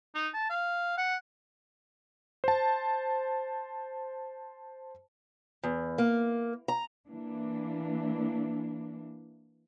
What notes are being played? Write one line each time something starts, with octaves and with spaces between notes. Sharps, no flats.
D#4
A5
F5
F#5
C5 A5
E2
A#3
A#5
E3 A#3 D4